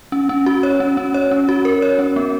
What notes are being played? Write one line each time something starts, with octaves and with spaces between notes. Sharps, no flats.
C#4
C#4
F#4
C#5
C#4
C#4
C#5
C#4
F#4
A#4
C#5
C#4
B3